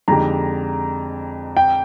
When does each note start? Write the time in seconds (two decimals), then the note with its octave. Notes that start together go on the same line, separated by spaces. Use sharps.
0.08 F2 D3 G#3 D#4 G4 A#5
1.57 G5